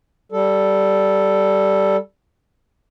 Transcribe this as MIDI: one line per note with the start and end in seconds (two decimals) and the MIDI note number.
0.32 1.96 55
0.32 1.96 69